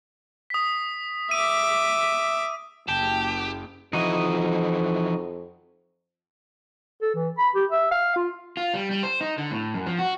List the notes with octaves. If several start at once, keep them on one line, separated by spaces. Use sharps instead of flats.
D#6 B6
E5 D6 D#7
F#1 G4 G5 A5
F2 E3 F3 D#4 E4 F#4 D#5
A4
E3
B5
G4
E5
F5
F4
F4
G3
G3
C5
D#4
D3
A2
F#2
F3
F#4